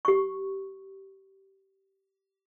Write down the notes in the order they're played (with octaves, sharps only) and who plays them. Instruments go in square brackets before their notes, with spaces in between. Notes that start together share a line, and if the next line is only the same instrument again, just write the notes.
[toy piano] G4 C#6